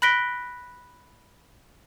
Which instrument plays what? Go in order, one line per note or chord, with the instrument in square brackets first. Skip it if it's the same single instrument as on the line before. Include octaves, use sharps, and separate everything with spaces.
[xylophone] B5 F#6 A#6 B6 D7 G7